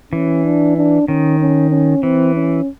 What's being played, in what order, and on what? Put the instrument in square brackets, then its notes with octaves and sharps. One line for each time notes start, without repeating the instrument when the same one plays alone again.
[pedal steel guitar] E3 [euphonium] C#4
[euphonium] D4
D4
[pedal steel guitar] D#3 [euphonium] C#4
[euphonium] C#4
C#4
[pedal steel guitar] E3 [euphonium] C4
[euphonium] C#4